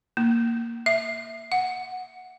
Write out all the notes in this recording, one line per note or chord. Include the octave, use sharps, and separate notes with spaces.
A#3
E5
F#5